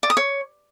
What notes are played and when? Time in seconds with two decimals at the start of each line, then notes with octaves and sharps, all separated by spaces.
0.03 D5
0.10 D#6
0.17 C#5